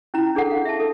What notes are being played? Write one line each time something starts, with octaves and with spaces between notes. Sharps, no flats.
C#4 E4 F4 A#5
D4 G#4 A4 F#5
F5
E5 A5
A4